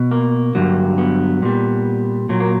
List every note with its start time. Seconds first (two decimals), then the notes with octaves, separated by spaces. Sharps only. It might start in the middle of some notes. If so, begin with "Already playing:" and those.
Already playing: B2
0.11 A#3
0.55 G2 D3 F#3
0.98 B3
1.42 A#2 G3
2.29 A#2 F#3
2.40 A#3